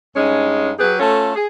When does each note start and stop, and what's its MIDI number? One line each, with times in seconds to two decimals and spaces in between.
0.16 0.71 43
0.16 0.71 56
0.16 0.71 61
0.16 0.71 63
0.79 0.96 54
0.79 0.96 67
0.79 0.96 68
0.79 0.96 71
0.99 1.32 57
0.99 1.32 61
0.99 1.32 65
0.99 1.32 69
1.36 1.46 68